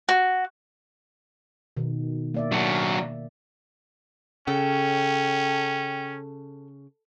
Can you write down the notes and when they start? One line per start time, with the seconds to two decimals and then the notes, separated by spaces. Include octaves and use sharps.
0.09 F#4
1.77 B2 D#3
2.34 A#3 D5 E5
2.52 F#3 D4
4.47 C#3 C#4 A4 G5